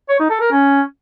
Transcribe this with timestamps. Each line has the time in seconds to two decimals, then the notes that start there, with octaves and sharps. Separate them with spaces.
0.09 C#5
0.20 D#4
0.30 A4
0.41 A#4
0.51 C#4